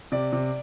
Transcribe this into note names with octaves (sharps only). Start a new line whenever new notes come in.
C3 D5
C3